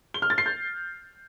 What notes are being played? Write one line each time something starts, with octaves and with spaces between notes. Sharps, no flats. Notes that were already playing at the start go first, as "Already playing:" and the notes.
G7
F6
A6
C7
G6